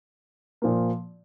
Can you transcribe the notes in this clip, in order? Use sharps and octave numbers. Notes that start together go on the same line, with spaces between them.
A#2 F3 A#3